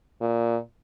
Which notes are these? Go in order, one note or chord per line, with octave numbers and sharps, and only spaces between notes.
A#2